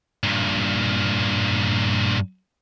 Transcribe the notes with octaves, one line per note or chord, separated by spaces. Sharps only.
G2 A#2